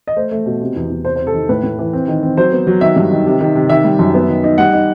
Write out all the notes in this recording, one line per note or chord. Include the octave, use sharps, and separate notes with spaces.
D#5
A3 C5
A3
B2
C3
E2
E2
C3 C5
C5
C3
A4
D#3
A2 B4
A2
E3
C4
D#3
C4
F#3 C5
B3
F#3
D#3 E5
G2
D#3
C3
D#3
C3
D#3 E5
G3
F#2
B3
D#3
D#4
G3 F#5
D#4